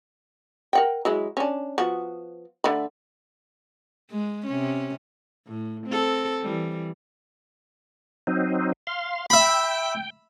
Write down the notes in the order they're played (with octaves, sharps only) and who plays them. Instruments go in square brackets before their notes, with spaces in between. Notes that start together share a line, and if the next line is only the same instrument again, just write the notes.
[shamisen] A#4 F#5 G5
F#3 G#3 E4
C#4 D4
F3 B3 F#4
D3 A3 B5
[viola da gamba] G#3
C3 C#4
A2
C4 A4
E3 G3
[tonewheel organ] F#3 C4 D#4
F5 C6
[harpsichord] E5 B5 [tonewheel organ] G5